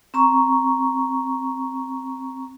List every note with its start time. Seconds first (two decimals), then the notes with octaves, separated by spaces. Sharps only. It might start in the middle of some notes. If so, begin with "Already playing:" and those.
0.14 C4 A#5 C#6